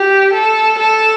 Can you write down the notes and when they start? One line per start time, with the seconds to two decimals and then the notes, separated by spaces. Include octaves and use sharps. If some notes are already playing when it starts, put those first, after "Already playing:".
Already playing: G4
0.33 A4
0.79 A4